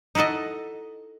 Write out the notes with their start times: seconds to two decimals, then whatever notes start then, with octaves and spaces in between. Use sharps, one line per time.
0.15 D#4 E4 F#4 A4 D#5